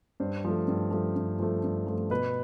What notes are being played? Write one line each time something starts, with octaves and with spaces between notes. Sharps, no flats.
G2 C5
F3 A3
G2
F3 A3
G2
F3 A3
G2
F3 A3
B2 B4